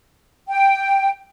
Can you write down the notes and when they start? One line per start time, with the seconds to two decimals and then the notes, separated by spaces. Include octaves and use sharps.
0.48 G5